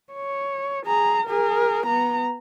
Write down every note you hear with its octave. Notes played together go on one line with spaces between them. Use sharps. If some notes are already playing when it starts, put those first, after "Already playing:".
C#5
G#4 A#5
G#4 A#4
B3 A#5